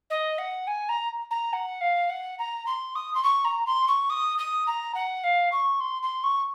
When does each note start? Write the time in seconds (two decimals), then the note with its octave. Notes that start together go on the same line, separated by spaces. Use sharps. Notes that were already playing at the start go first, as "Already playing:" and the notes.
0.10 D#5
0.38 F#5
0.67 G#5
0.89 A#5
1.31 A#5
1.53 F#5
1.81 F5
2.10 F#5
2.39 A#5
2.66 C6
2.95 D#6
3.14 C6
3.24 C#6
3.45 A#5
3.66 C6
3.88 C#6
4.10 D#6
4.38 D#6
4.67 A#5
4.95 F#5
5.24 F5
5.52 C#6
5.80 C6
6.03 C6
6.24 C#6